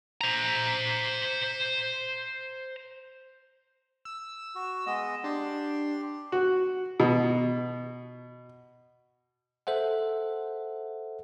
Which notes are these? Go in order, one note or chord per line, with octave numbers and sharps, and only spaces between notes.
C5 A#5
E6
F#4
G#3 B3 D#5
D4 G4 C6
F#4
B2
A4 C5 E5 F#5